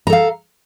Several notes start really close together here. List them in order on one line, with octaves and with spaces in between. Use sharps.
A#5 A4 F5